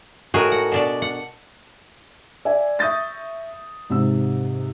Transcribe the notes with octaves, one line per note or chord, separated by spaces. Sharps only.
A2 D#4 F#4 G#4 A#4
F#5
B2 D4 D5
F#5
D5 E5 G#5
E5 C#6 D#6 G6 A6 A#6
G#2 C3 E6